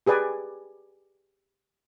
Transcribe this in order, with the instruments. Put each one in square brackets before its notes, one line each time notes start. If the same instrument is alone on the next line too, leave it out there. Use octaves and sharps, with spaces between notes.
[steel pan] G4 G#4 B4 D5 G#5